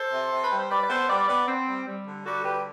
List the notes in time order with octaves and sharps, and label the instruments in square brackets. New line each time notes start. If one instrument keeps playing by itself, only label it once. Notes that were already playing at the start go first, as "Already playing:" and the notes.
Already playing: [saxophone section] A4 C5
C3
C3
B4
G3
C5
G3 B4 D5
D5
B3 A4 C5
G3 B4 D5
B3 B4 D5
C4
G3
G3
D3
G3 F#4 A4
D3 G4 B4